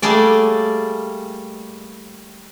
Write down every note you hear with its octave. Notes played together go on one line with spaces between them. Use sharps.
G3 A3 A#3 G#4 D5